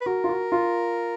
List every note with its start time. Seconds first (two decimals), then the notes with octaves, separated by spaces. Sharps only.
0.01 B4
0.06 F#4 A#4
0.24 F4
0.29 F#4
0.52 F4